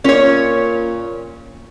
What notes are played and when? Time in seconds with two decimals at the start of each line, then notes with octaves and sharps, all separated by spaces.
0.04 A#2 C#4 C#5